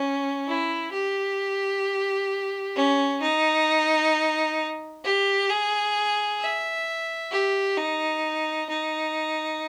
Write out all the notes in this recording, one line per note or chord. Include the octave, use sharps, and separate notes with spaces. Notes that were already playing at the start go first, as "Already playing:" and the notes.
Already playing: C#4
E4
G4
C#4
D#4
G4
G#4
E5
G4
D#4
D#4